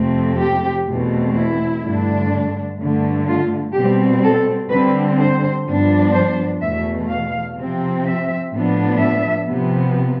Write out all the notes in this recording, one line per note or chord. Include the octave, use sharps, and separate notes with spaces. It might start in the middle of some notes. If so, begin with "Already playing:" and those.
Already playing: F2 C3 F3 A3 C4
G4
E2 B2 A3 C4
E4
G2 D3 A3 D4
G2 D3 A3
F4
B2 G3 C4 G4
A4
D3 G3 C4 B4
C5
G2 F3 B3 D4
C5
E2 B2 A3 E5
F5
C3 F3 C4
E5
A2 F3 B3 D4
E5
C3 F3 B3